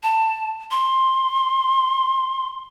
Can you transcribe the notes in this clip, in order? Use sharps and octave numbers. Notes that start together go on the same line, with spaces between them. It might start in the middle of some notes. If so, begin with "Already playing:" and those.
A5
C6